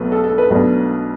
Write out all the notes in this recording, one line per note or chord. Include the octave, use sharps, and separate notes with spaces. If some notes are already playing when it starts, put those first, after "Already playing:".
Already playing: B1 B2 F#3 A3 B4
A4
A4
B4
B1 B2 A3 D4